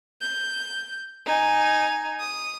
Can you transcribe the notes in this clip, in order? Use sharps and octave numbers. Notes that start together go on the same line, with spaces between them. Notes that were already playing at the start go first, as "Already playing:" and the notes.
G6
D#4 G#5
D#6